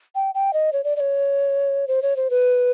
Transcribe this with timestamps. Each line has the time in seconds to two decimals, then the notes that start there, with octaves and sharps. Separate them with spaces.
0.15 G5
0.35 G5
0.53 D#5
0.73 C#5
0.84 D5
0.96 D5
1.00 C#5
1.88 C5
2.02 C#5
2.16 C5
2.30 B4